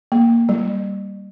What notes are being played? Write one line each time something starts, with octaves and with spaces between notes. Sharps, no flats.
A#3
G3